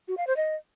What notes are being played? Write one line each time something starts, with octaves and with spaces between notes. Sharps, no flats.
F#4
F5
C5
D#5